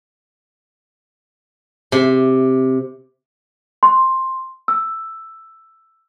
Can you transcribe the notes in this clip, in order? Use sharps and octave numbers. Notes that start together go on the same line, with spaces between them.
C3
C6
E6